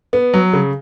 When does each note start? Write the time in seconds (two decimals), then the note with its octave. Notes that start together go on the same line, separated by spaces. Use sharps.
0.13 B3
0.34 F#3
0.53 C#3